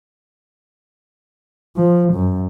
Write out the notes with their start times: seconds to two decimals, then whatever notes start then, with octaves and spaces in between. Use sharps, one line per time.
1.77 F3
2.13 F#2